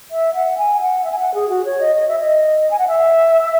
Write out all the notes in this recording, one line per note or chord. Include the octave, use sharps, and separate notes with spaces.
E5
F#5
G#5
F#5
E5
G#5
F#5
G#4
F#4
C#5
D#5
D#5
E5
D#5
G#5
F#5
E5